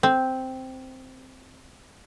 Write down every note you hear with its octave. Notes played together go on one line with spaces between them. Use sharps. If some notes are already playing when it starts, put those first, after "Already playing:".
C4